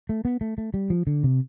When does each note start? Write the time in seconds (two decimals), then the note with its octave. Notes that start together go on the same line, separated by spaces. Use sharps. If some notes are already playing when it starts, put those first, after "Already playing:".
0.09 A3
0.25 B3
0.41 A3
0.58 A3
0.74 G3
0.90 F3
1.07 D3
1.24 C3